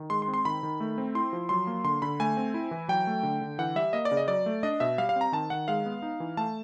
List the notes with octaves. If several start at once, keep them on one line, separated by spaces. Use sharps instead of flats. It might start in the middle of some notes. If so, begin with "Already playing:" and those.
Already playing: D#3
G#3 C6
C6
C4
C6
D#3 B5
D#3
A3
C4
E4 C6
F3
F#3 C6
A#3
D3 C6
D3 B5
A3 G#5
C4
E4
E3
F#3 G5
A3
D3
D3
E3 F#5
G3 E5
A#3 D#5
D5
C#3
D#5
F#3 D5
A3
D4 D#5
B2 E5
G3 F5
F5
C4
A#5
D#3 A5
D#3 F#5
G#3 F5
B3
D#4
E3
A3 A5